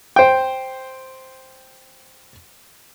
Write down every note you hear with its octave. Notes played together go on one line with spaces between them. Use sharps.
C5 G5